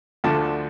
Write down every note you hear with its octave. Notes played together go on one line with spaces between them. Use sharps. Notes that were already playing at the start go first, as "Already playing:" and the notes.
D2 D3 F3 A3 A5